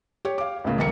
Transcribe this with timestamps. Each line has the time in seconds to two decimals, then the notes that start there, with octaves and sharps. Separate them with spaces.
0.25 G4 C#5
0.38 F5 D6
0.64 C#2 A2 C#3 A#3
0.78 D#1 A#1 A#4 C#7